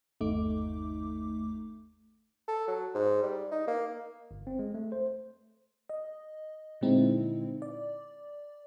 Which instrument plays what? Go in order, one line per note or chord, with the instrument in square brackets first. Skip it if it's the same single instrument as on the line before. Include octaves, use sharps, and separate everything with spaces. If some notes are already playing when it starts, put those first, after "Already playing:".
[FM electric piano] G1 D#2 A3 D#4 D6
[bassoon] A4
F#3
G#2
G3
D#4
A#3
[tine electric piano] G1
C4
G#3
A3
C5
[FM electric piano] D#5
A#2 D3 G#3 C4 D#4 E4
D5